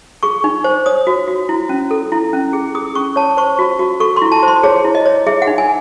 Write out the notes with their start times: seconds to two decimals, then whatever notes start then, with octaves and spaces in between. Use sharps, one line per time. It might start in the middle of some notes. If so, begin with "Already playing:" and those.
0.23 G#4 C#6
0.44 D#4
0.64 C5
0.86 C#5 D#6
1.07 F#4
1.28 F#4
1.49 E4
1.69 C#4
1.91 A4
2.12 E4
2.33 C#4
2.53 G#4
2.75 G#4 D#6
2.95 C#4 C#6
3.16 C#5 A5
3.37 C5 C#6
3.59 F#4
3.79 F#4
4.00 A4 C#6
4.16 C6
4.22 E4
4.32 A5
4.43 C5
4.48 C6
4.63 G#4 C#5
4.85 E4
4.95 D#5
5.06 C#5
5.27 G#4 E5
5.42 F#5
5.47 D#4
5.58 G#5